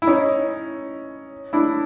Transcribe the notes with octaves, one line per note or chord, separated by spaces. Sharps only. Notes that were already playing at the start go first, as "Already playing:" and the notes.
E4
C#4 D#4
D4 E4